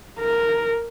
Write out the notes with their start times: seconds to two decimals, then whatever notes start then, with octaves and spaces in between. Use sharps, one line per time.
0.19 A#4